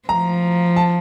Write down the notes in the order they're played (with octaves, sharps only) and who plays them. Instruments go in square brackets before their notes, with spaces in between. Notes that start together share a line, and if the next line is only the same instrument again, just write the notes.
[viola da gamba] F3 [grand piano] A#5
[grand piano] A5